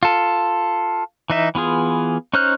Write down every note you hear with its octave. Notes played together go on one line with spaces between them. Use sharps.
F4 A4
E3 D#4 E5
E3 B3 F4 G#4
C#4 D#4 C5 F6 F#6